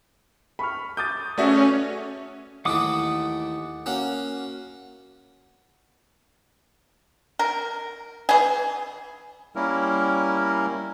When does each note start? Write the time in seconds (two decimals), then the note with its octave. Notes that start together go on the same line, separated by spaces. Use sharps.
0.59 B5 C#6 F6
0.97 D6 D#6 G6 A6
1.38 A3 C#4 F#4 G#4 B4 D5 E5
2.65 D#2 E3 A3 F#5 D6 D#6
3.86 A#3 C#4 F#4
7.39 A#4
8.29 E3 G#4
9.55 G3 A#3 C#4 E4 A#4